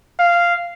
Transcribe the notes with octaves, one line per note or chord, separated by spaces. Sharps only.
F5